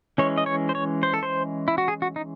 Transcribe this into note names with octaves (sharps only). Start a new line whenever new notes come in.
E3 G#3 C#4 C#5
D#5
C#5
C5
C#5
C5
A4
C5
E4
F#4
G#4
F#4
D#4